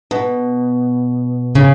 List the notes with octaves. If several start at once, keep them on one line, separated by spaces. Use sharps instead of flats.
B2
C#3